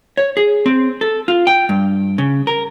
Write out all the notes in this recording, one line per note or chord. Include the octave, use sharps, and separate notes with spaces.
C#5
G#4
C4
A4
F4
G5
G2
C#3
A#4